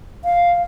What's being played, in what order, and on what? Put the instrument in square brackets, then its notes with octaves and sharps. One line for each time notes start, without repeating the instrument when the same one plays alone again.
[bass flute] F5